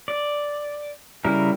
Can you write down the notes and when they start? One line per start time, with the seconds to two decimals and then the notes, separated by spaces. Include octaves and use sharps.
0.08 D5
1.25 C#3 G3 E4 A#4